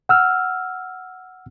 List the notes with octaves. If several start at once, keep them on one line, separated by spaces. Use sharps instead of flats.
F#5 E6 F6